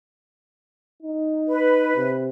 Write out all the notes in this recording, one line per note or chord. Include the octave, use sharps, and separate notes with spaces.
D#4
B4
C3